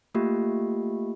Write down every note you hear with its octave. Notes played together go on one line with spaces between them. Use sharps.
A3 A#3 F4 G4